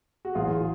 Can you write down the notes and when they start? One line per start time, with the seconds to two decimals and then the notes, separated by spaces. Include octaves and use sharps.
0.25 F#4
0.35 A1 A2 F#3 F4 G#4